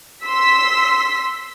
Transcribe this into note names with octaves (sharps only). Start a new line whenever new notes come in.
C6 E6 B6